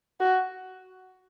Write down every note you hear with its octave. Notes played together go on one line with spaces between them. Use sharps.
F#4